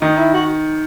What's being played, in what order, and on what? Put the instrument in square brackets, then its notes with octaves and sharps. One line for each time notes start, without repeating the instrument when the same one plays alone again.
[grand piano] D#3 [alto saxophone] D#4
[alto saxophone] E4
F#4